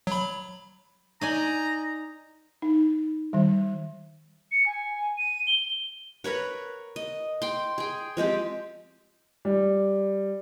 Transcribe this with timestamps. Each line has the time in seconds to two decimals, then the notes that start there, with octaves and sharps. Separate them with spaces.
0.07 F#3 B5
1.21 D#4 D5 G#5 A#5
2.62 D#4
3.33 D#3 G3
4.52 C#7
4.66 G#5
5.18 D#7
5.47 G7
6.24 A#4 B4 C#5 F#5
6.96 D#5
7.42 G5 C6
7.78 G#4 G5
8.17 F3 G#3 C4 G4
9.45 G3